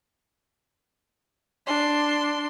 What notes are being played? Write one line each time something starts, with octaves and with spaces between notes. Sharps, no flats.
D4 C6